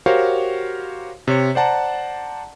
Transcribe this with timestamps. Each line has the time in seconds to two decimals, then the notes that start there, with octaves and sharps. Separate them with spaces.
0.06 F#4 G4 A#4 C5 C#5 F5
1.28 C3 C#5 C#7
1.55 C5 D5 F#5 A5 A#5